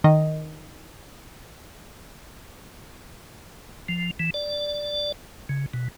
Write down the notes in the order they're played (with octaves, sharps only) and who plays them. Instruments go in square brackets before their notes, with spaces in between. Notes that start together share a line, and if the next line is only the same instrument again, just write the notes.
[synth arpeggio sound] D#3 D#5
[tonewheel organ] F3
E3
D5
C#3
B2